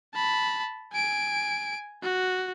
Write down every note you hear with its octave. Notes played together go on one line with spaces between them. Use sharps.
A5 B5
G#5 D7
F#4